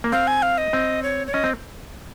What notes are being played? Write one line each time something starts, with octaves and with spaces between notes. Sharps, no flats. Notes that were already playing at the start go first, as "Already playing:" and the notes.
A#3
C4 F5
G#5
F5
D#5
C4
C#5
C#5
C#4 D#5
C4